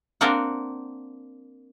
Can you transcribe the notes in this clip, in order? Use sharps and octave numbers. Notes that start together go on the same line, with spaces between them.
A#3 C4 D4 A#4 D5 F#5